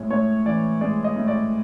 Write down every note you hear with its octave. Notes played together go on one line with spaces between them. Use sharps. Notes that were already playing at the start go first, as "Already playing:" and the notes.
Already playing: A2 G#3 C#5
A2 C#5
E3 D5
G#3 D5
D#5
A2
D5